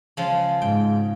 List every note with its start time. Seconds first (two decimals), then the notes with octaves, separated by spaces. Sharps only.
0.17 C#3 F3 G#3
0.62 G#2 G5